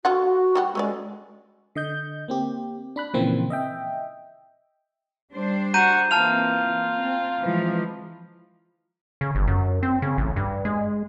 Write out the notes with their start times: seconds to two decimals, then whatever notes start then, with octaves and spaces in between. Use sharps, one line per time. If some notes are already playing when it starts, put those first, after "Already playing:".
0.05 D3 F4 F#4 F#5
0.55 G3 G4 F#5
0.75 G#3 A3 C#4 D5
1.76 D3 D#5 G6
2.28 A#3 C4 G4
2.96 D4 B5 F#6
3.14 A#2 C#3 E3 F3 A#3 C4
3.50 D#5 E5 G5
5.32 G3 D4 C5
5.74 F#4 A#5 G6 D#7
6.11 E3 A#3 C4 F4 A5 F6 F7
7.00 C4
7.41 E3 F3 G#3
9.21 C#3
9.35 G1
9.47 F#2
9.83 C4
10.02 C#3
10.18 A1
10.36 G2
10.65 G#3